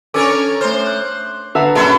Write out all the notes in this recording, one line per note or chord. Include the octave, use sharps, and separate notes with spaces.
C#4 D4 A4 A#4 C#5 G#5 D6 A6
A3 C5 C6 F6
F#6
D3 B4 E5 F#5 A5 A#5
A#1 F#2 E4 F#4 G#4 A4 C6